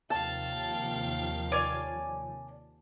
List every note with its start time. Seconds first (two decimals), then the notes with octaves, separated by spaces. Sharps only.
0.10 D#2 C3 F3 F5 G5 A5
1.52 C#5 D5 G#5